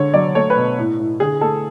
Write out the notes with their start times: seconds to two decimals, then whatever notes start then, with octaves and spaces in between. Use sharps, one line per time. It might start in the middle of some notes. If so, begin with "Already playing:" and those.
Already playing: D3 G#3 C#5
0.14 F#3 D5
0.35 A3 C#5
0.50 B4
0.57 B2
0.78 A2
0.99 A2
1.20 D3 G#4
1.41 A3 A4